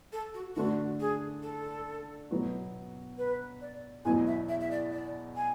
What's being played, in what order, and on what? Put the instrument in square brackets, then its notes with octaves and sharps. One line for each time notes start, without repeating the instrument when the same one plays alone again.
[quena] A4
F#4
[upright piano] D3 A3 D4 [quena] F#4
[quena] G#4
A4
[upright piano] B2 F#3 B3 F#4
[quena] B4
D5
[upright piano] E2 B2 F#3 [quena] G#5
[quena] E5
E5
E5
D5
D5
G#5